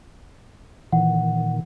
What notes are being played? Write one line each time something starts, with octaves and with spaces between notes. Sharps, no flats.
A#2 D#3 E3 F#5